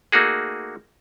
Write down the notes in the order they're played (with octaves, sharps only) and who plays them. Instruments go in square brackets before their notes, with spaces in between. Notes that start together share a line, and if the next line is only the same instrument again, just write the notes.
[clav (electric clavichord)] A3 A#3 D#4 F#4 G#4